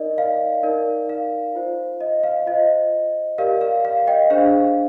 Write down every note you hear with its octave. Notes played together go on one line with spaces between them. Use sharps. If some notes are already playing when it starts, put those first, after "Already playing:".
Already playing: D#4 A#4 D5 D#5
F5
D#4 A#4 D5
F5
F4 C5
D#5
F5
F4 C5 D#5
G4 A#4 D5 F5
F5
F5
D#5 G5
D4 G#4 C5 F5